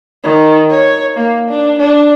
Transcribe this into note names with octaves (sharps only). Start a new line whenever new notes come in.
D#3
C#5
A#3
D4
D4